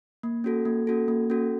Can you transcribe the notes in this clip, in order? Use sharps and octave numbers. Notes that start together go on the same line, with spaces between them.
A#3
C#4 F#4 A4
A#3
C#4 F#4 A4
A#3
C#4 F#4 A4